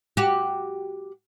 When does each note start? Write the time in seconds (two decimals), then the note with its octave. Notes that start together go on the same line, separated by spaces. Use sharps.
0.17 F#4 G4